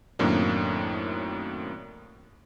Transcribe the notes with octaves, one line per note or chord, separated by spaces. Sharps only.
F#2 A2 D#3 A#3 C4 D4